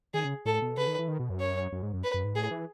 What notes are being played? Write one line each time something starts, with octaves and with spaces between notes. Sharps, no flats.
D#3 G#4
C#3
A2 A4
B2
C#3 B4
D#3
E3
D#3
B2
F#2
C#5
F#2
G#2
F#2
B4
F#2
G#2
A2 G#4
E3